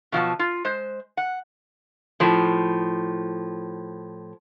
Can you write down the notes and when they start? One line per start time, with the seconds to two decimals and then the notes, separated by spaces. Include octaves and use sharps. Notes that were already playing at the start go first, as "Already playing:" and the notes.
0.12 B2 F3 F#3 A5
0.39 F4
0.64 G#3 C5
1.17 F#5
2.20 A2 F3